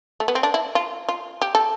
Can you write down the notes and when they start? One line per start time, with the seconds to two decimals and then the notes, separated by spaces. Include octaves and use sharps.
0.20 A3
0.28 B3
0.35 C4
0.43 D4
0.54 E4
0.75 F4
1.09 F4
1.42 G4
1.55 A4